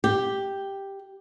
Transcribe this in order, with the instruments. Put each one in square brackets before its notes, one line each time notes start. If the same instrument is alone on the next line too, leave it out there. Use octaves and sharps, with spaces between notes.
[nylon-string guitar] G4